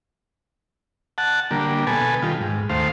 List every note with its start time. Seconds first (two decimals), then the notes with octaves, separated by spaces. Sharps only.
1.18 F#5 A5
1.51 D3 G3 A#3
1.87 B2 A4 B4 G#5
2.22 D#3 G3 F4
2.41 G#2
2.69 D#2 A3 C5 F5